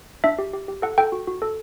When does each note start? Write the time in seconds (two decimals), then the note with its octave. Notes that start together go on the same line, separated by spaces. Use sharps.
0.24 D4 E5
0.39 G4
0.54 G4
0.68 G4
0.82 A4 F#5
0.98 A4 G5
1.12 F#4
1.28 F#4
1.42 A4